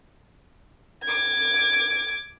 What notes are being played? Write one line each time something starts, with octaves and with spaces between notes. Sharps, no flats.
D6 G#6